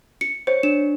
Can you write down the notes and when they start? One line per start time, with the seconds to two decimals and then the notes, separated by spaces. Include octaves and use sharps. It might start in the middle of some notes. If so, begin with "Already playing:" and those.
0.21 C#7
0.47 C5 C#5 C#7
0.63 D4 E7